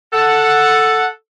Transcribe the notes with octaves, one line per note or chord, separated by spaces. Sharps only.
A4 F#5